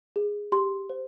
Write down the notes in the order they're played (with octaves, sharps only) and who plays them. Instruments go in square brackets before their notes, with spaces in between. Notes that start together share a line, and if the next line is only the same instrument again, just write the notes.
[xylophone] G#4
G4 C6
C5